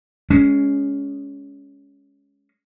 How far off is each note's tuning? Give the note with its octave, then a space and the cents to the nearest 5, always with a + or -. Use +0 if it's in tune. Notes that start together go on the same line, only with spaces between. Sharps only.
G#3 +0 C#4 +15